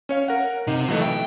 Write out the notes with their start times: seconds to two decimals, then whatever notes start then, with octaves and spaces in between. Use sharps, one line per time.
0.09 C#4 C#5 F5
0.28 A#4 F#5
0.67 C3 D#4
0.88 B1 E3 A3 F#4 D#5
1.02 E5 G5